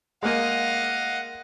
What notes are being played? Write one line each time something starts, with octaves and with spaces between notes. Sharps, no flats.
G#3 A#3 D#5 F5 F#5